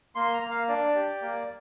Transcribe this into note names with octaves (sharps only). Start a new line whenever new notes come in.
A#3 C6
A#5
A#3
F5
D4 D5
G4
A#3